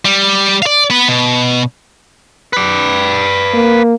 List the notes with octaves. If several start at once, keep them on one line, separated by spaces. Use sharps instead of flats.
G3
D5 F5
B3 B4
B2
B4 D5
A#3